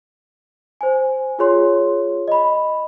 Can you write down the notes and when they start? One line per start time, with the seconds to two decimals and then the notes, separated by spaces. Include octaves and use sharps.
0.81 C5 G#5
1.39 F4 G#4 C#5 C6
2.28 D#5 B5